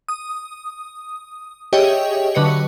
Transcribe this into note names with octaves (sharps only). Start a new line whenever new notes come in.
D#6
G4 G#4 C#5 D#5 E5 G5
D3 F#3 B4 D#5 C#7